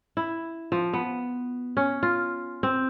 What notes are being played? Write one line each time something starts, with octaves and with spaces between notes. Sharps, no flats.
E4
F3
B3
C#4
F4
C4